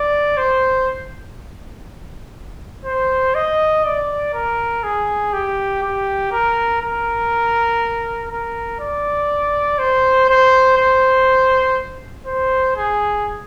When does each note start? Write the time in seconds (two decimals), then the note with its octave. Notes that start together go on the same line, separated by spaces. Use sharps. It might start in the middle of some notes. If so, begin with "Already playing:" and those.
Already playing: D5
0.37 C5
2.85 C5
3.35 D#5
3.84 D5
4.34 A#4
4.83 G#4
5.33 G4
5.82 G4
6.31 A#4
6.81 A#4
8.30 A#4
8.80 D5
9.79 C5
10.29 C5
10.77 C5
12.26 C5
12.76 G#4